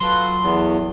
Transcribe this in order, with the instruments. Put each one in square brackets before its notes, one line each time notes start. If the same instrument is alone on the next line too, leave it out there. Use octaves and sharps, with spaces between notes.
[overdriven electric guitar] F#3 [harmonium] F4 A4 B4 [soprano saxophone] C6
[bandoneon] E2 [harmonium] A3 B3 A5